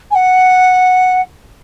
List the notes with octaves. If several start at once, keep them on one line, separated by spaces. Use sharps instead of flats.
G#5
F#5